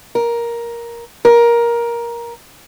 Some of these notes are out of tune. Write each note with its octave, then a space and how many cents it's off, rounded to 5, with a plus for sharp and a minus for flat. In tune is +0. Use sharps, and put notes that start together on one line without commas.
A#4 +10
A#4 +15